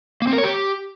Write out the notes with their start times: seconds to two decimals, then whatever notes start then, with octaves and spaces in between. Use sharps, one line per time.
0.22 A#3
0.27 C4
0.33 A#4
0.38 C#5
0.43 G4